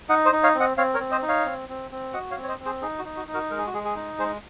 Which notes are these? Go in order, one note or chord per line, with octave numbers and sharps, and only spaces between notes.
D#4 D#5 F#5
C5 D#5
D#4
C#5 F5
C4
D#5 F#5
C4 C#5 F5
A#4 C#5
C4
C5 D#5
D#4
C#5 F5
C4
C4
C4
F#4 D#5 F#5
C#5 F5
C4
C#5
C5 D#5
C4
G#4 C5
D#4 G#4
F#4
D#4
F#4
D#4
F#4 A#4
G#3 A#4
G#4
F#4
G#3 G#4
G#4
D#4
G#3 G#4 C5